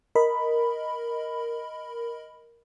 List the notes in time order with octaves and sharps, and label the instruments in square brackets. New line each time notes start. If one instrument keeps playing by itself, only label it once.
[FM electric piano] A#4 D#5 B5